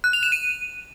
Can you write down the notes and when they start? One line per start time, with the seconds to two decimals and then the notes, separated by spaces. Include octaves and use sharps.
0.04 F#6
0.13 F7
0.23 E7
0.32 D#7